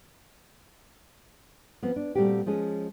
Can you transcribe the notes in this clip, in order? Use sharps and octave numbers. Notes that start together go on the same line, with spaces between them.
F3 B3 C4
D4
A#2 G3 A3 C4 F#4 G4
F3 G#3 C#4 G#4